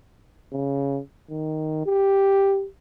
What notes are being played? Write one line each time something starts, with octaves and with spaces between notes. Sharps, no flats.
C#3
D#3
G4